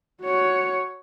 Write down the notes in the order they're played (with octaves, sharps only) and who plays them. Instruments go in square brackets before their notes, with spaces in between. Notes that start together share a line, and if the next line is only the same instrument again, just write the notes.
[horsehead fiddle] F#4 C#5